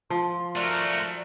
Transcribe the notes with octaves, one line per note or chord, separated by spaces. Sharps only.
F3 C6
A3 F4 F#4 A#4 D5